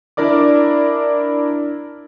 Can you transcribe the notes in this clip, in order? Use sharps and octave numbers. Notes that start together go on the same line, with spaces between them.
D4 E4 A#4 D5 D6